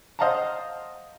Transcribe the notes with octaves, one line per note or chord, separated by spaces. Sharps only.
C5 D#5 F5 F#5 A5 A#5